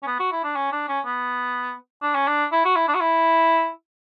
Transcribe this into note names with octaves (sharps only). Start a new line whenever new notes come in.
C#4
B3
F#4
E4
D4
C#4
D4
C#4
B3
D4
C#4
D4
E4
F#4
E4
D4
F#4
E4